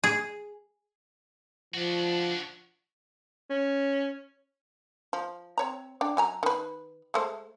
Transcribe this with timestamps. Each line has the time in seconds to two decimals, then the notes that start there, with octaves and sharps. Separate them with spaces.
0.04 G#4
1.74 F3 D4 F#4
3.50 C#4
5.13 F3
5.58 C4 C#5 A#5
6.01 D4 D5 G5
6.17 F#3 G#5 A#5
6.43 D#3 B4
7.14 G#3 A3 C5